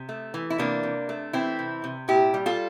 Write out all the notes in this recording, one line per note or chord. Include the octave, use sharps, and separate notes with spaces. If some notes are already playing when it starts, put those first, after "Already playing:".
Already playing: C3
A3
E3
E4
C3 A#3 D4
C3
A3
E3 C4 E4
C3
C3
A#2 E4 G4
G3
F4 A4